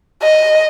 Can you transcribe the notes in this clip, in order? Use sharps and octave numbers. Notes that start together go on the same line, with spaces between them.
D#5